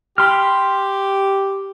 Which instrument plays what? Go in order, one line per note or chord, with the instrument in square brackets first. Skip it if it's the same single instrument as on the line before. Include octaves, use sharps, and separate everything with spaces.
[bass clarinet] G4 [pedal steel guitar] B5 C6 F6